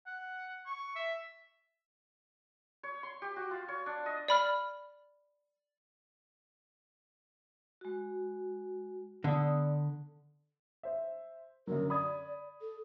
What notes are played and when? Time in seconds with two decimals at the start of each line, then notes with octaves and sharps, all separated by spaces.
0.06 F#5
0.66 C#6
0.96 E5
2.83 C#5
3.03 C6
3.22 G4
3.36 F#4
3.51 F4
3.68 C#5
3.86 D4
4.06 D#5
4.28 D5 B5 F6
7.81 G#3 F#4
9.24 D3 B3 D5 D#6
10.83 C5 E5
11.67 F#2 D3 F#3 A#4
11.90 D5 B5 D#6 G#6
12.61 A4